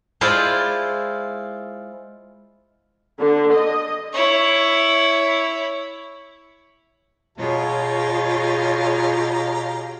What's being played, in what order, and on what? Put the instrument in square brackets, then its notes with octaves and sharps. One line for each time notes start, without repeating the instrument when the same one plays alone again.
[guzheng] G#3 E4 F4 C5 D5
[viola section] D3
D#5
[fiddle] E4 C#5
[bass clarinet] B2 [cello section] F4 G#4 C#5 [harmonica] G4 F5 A#5